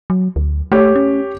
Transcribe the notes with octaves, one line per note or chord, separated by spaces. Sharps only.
F#3
D2
A3 G4 C#5
C#4